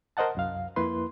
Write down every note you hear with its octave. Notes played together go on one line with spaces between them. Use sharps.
A#4 C5 D#5 F#5 A5
C2 F#2 F5
F2 A#3 E4 B4 C6